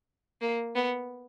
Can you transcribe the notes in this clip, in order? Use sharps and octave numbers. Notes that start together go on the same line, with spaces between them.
A#3
B3